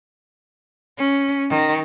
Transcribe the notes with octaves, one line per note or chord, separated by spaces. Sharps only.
C#4
D#3